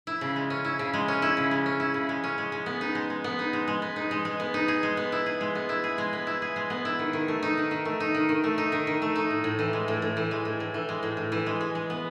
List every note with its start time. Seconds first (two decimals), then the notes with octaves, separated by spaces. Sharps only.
0.07 E4
0.21 C#3
0.36 G#3
0.50 C#4
0.65 E4
0.79 C#3
0.93 G#3
1.08 C#4
1.22 E4
1.37 C#3
1.51 G#3
1.66 C#4
1.80 E4
1.94 C#3
2.09 G#3
2.24 C#4
2.38 G#3
2.52 G#3
2.66 B3
2.81 D#4
2.95 G#3
3.10 G#3
3.24 B3
3.39 D#4
3.53 G#3
3.68 G#3
3.82 B3
3.96 D#4
4.11 G#3
4.25 G#3
4.40 B3
4.54 D#4
4.68 G#4
4.83 G#3
4.97 B3
5.12 E4
5.26 G#4
5.41 G#3
5.55 B3
5.69 E4
5.84 G#4
5.98 G#3
6.13 B3
6.27 E4
6.42 G#4
6.56 G#3
6.70 B3
6.85 E4
6.99 D#3
7.13 D#3
7.28 A3
7.43 D#4
7.57 D#3
7.71 D#3
7.85 A3
8.00 D#4
8.15 D#3
8.29 D#3
8.44 A3
8.58 D#4
8.72 D#3
8.87 D#3
9.02 A3
9.16 D#4
9.31 A2
9.44 A2
9.59 E3
9.73 G#3
9.88 A2
10.02 A2
10.17 E3
10.31 G#3
10.45 A2
10.60 A2
10.74 E3
10.89 G#3
11.03 A2
11.17 A2
11.32 E3
11.46 G#3
11.61 G#3
11.75 G#3
11.90 B3